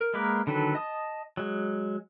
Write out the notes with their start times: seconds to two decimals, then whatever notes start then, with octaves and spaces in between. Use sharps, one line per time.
0.01 A#4
0.14 G#3 A#3 A#4 B4 D6
0.47 D3 D#3 F#3 A4 B4
0.75 D#5 A5 D#6
1.37 F#3 G#3